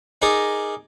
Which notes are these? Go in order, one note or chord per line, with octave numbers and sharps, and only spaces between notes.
D#4 G#4 A#4 D5